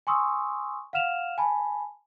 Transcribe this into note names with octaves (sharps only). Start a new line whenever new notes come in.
G#5 C6 C#6 D#6 E6
F5 F#5 F6 E7 F7
G#5 A5 B5